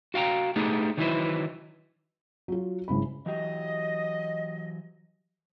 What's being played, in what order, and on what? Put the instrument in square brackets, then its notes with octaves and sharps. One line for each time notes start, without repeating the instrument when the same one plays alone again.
[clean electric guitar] F#4 F5 G5 A#5
G3 A3 B3 D4 D#4 G#4
D#3 E3 F#3 E4 B4 C5
[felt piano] F#3 F4
G#1 G#2 C#3 E4 B5
[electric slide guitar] E3 F#3 G4 [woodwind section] D#5